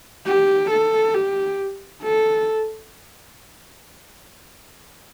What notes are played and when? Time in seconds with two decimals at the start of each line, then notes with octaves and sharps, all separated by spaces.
0.26 G4
0.71 A4
1.14 G4
2.03 A4